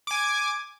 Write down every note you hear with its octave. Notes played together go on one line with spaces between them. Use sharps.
G#5 D6 G#6